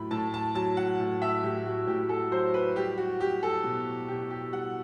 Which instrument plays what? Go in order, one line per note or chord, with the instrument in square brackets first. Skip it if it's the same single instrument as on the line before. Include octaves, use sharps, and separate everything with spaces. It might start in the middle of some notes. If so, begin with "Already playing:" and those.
Already playing: [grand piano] A2 F#3 B5
A2 A5
A5
F#3 A5
F#5
A2
E5
A2 G4
F#4
A2 G4
A4
F#3 C5
B4
G3 G4
F#4
G3 G4
A4
B2
B2 G4
G4
G3 F#5